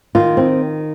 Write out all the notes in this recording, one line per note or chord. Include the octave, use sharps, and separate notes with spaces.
D#3 F4
C4